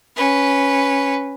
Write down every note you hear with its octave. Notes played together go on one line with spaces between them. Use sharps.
C#4 B4